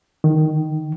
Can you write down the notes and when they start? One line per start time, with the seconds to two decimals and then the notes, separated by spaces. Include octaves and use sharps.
0.24 D#3